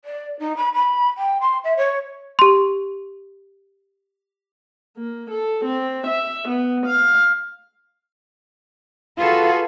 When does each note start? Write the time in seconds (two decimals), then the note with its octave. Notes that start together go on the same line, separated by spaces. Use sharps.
0.04 D5
0.39 D#4
0.56 B5
0.74 B5
1.17 G5
1.40 C6
1.64 E5
1.77 C#5
2.39 G4 C6
4.97 A#3
5.31 A4
5.65 C4
6.07 E5
6.48 B3
6.86 F5
9.18 F4 F#4 G#4 A4 B4